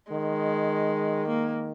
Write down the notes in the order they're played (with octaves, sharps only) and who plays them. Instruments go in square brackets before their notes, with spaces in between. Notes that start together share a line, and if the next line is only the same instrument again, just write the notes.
[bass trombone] D#3 [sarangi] G#3
[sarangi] A#3